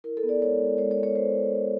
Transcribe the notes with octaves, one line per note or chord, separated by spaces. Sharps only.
E4 A#4
A4
B3
D5
G#3 C#5
G#3
G#3 C#5
C#5
B3
C#5
E4 C5